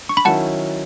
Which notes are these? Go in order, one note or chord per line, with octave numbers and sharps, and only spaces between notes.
C#6
B5
D#3 F#3 C#4 E4 F#5 A5